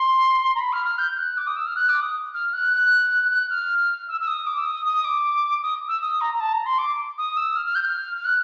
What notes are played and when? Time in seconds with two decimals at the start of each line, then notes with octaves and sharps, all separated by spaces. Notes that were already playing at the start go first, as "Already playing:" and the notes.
Already playing: C6
0.55 A#5
0.60 B5
0.73 F6
0.86 F6
0.98 G6
1.18 F#6
1.37 D6
1.47 D#6
1.56 E6
1.66 F6
1.76 F#6
1.89 D6
2.02 D#6
2.34 F6
2.53 F#6
2.73 F#6
3.31 F#6
3.50 F6
4.08 E6
4.21 E6
4.27 D#6
4.47 D6
4.58 E6
4.65 D#6
4.86 D#6
5.04 D6
5.63 D#6
5.88 E6
6.02 D#6
6.21 A#5
6.34 A#5
6.40 A5
6.53 A#5
6.66 C6
6.78 D6
7.18 D#6
7.37 E6
7.56 F6
7.66 F6
7.75 G6
7.85 F6
8.16 F6
8.25 F#6